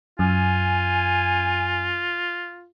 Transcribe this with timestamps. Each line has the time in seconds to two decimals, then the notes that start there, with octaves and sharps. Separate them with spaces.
0.19 F#2 F4 G#5